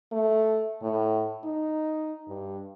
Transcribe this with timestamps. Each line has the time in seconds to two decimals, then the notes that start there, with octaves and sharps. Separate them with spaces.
0.12 A3
0.82 A2
1.44 D#4
2.28 G2